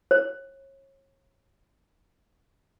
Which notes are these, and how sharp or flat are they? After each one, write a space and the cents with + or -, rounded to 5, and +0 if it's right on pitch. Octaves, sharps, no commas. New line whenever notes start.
C#5 -30